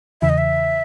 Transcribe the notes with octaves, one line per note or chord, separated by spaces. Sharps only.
E2 C#3 E3 E5
D#5
E5